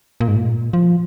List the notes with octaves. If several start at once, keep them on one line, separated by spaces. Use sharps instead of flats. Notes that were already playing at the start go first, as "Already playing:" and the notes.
A#2
G#2
A#2
F3